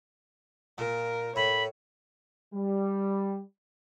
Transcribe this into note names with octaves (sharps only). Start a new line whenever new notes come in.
A#2 A#4
A2 C#5 B5
G3